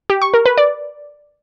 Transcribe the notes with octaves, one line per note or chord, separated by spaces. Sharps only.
G4
C#6
A#4
B4
D5